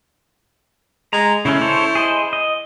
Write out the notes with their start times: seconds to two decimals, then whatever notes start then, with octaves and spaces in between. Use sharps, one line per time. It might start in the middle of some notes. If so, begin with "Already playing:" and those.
1.13 G#3 A#5
1.45 C#3 A3 C#4 E4
1.61 A4 C5 C#5
1.95 G#4 C5 D#5
2.33 D#5